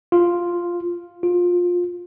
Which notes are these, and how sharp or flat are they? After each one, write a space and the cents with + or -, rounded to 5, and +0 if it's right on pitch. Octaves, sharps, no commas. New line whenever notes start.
F4 +0
F4 +20